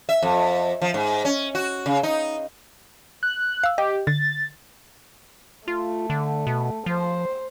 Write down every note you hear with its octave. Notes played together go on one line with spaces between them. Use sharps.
E5
F2
F3
G#2
C#4
F#4
C#3
D#4
F#6
F5 E6
G4 D#5
D3 A6
A3 F4
D3
B2
F3 C5